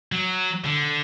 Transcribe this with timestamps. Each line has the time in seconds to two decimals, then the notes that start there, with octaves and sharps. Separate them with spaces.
0.12 F#3
0.65 D3